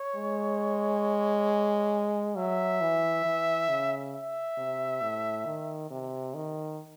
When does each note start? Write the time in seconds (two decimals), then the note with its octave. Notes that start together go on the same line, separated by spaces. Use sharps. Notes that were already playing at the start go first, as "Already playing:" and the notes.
Already playing: C#5
0.16 G#3
2.37 F#3 E5
2.81 E3
3.25 E3
3.69 C#3
4.13 E5
4.57 C3
5.02 A2
5.45 D#3
5.90 C3
6.34 D#3